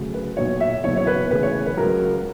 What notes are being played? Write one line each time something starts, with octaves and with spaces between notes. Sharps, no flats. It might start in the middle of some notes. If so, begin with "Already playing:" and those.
Already playing: D2 C#3 F#3
B4
B1 A#2 F#3 C#5
E5
F#1 E2 B2 F#3 C#5
C#5
B4
D2 C#3 E3 B4
C#5
B4
C#2 C#3 F#3 A#4